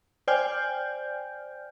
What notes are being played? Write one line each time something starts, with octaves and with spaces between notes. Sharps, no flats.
C5 D5 G5 G#5 F6 G6